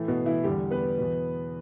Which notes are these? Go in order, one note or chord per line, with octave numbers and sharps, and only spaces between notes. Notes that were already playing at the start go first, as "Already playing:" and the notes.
Already playing: A2 E3 A3
B2 B3
E3 E4
E2 D3 G3 G4
B3 B4
E2 B2